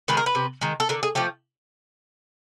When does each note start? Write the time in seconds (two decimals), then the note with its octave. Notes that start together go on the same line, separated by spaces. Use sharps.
0.08 D#3 G#3 B4
0.17 A#4
0.26 B4
0.35 C3
0.61 D#3 G#3
0.80 A4
0.89 D3 A#4
1.03 G#4
1.15 F3 A3 G4